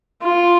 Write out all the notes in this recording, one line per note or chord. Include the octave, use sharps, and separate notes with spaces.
F4